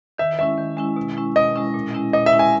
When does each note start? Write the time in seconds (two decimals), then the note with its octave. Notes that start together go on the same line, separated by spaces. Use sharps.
0.18 D#3 E5
0.39 G#3 C#4 E4 E5
0.58 D#3
0.77 G#3 C#4 E4
0.96 B2
1.17 G#3 C#4 E4
1.36 B2 D#5
1.56 G#3 C#4 E4
1.74 A#2
1.94 G#3 C#4 E4
2.13 A#2 D#5
2.26 E5
2.32 G#3 C#4 E4
2.39 G#5